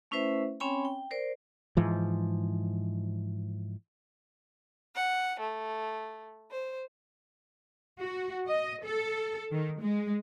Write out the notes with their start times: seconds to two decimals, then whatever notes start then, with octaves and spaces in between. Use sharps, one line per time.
0.11 A3 C#4 E4 B4 C5 E5
0.60 C4 C#4 C#5 G5 G#5 B5
0.85 G5
1.11 A#4 C5 D5
1.77 G#2 E3 F3
4.95 F#5
5.40 A3
6.50 C5
8.00 F#4
8.47 D#5
8.84 A4
9.51 D#3
9.80 G#3